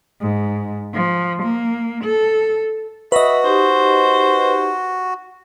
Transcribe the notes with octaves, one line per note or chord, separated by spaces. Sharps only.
G#2
F3
A#3
A4
F#4 B4 D#5 E5
D#4 G4 C5